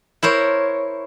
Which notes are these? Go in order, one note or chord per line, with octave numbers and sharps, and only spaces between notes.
E4 A#4 C5 C#5